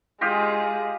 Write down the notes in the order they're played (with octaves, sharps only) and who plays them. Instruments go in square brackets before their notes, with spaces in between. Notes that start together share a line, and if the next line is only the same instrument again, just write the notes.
[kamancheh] G#3 G#4 [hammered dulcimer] F4 G4 D#5